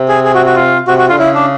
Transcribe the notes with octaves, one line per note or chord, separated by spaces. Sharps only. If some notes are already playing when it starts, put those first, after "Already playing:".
Already playing: C3
G#4
G#4
F#4
F#4
F4
C3 F#4
F#4
D3 F4
C#3 E4
D4